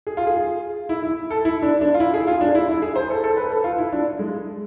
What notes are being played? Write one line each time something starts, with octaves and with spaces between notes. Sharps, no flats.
G#4
F4
G#4
E4
E4
A4
E4
D4
D4
F4
E4
G#4
F4
D4
E4
E4
G#4
C5
A4
A4
B4
A4
F4
E4
D4
G#3